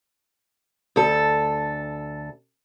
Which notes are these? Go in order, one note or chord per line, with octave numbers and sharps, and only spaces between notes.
D2 A4